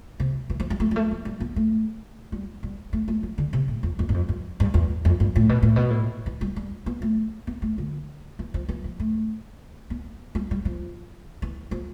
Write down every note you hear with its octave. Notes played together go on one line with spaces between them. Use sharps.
C3
E3
F3
G3
A3
G3
A3
F3
G3
B3
A3
G3
G3
A3
A3
F3
D3
C3
A2
F2
F2
G2
F2
G2
G2
E2
F2
G2
A2
B2
A2
B2
A2
E3
G3
G3
B3
A3
B3
A3
D3
E3
F3
E3
F3
A3
B3
G3
G3
F3
E3
F3